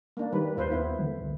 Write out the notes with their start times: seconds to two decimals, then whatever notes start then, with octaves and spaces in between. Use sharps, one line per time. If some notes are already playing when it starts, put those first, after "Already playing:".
0.17 A#3 D4
0.32 D#3 G3 B4
0.57 D#2 F4 B4 C5
0.71 B3 E4
0.99 D3
1.21 C2